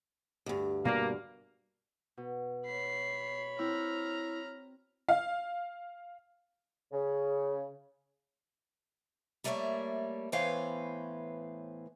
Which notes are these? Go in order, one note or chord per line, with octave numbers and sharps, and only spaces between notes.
D2 G2
B2 G3 A#3 D5
B2
C#5 B5 C7
C4 E4 A#5 F6
F5
C#3
G3 A3 A#3 A#4 C#5 E5
A2 E3 B3 C5 C#5 F5